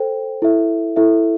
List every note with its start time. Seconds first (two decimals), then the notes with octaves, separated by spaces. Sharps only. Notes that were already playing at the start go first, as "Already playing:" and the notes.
Already playing: A4 C5 G5
0.42 E4 A4 E5
0.96 E4 A4 E5